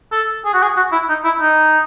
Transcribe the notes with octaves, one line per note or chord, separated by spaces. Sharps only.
A4
G#4
F#4
G#4
F#4
E4
D#4
E4
D#4